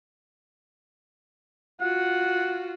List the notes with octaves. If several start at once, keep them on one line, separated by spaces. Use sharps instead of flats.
F4 F#4 F#5